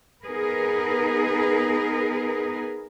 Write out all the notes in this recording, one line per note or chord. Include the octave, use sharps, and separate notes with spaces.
B3 D#4 G#4 A#4 B4